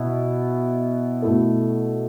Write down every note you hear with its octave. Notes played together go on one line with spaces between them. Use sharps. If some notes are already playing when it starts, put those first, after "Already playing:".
Already playing: B2 B3 E4
B2 A3 E4 A4